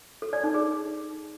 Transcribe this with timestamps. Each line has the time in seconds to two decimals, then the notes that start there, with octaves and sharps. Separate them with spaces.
0.22 A4
0.33 D5
0.44 D#4
0.54 G#4